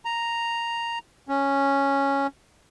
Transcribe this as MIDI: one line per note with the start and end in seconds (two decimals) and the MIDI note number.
0.05 0.99 82
1.28 2.27 61